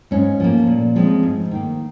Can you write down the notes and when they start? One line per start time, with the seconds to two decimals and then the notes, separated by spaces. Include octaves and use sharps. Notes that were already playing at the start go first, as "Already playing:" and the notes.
0.11 G#2 C#4
0.40 F3 A#3
0.67 A#2
0.96 F3 G#3 C4
1.23 G#2
1.51 D#3 A#3